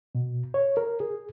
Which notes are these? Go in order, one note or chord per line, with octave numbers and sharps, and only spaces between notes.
B2
C#5
A#4
G#4